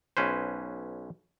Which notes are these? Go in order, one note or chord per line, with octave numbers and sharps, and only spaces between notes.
B1 C#4 B4 C5